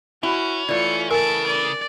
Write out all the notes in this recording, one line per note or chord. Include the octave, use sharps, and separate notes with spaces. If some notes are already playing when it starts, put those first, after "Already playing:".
C#4 E4 F#4
E3 A3 F4 D5 C#7
C#3 A#4 G#5 A5 D7
D5